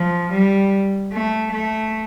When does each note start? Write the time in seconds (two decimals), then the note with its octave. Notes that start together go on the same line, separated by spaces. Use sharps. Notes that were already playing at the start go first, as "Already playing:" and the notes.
Already playing: F3
0.32 G3
1.13 A3
1.52 A3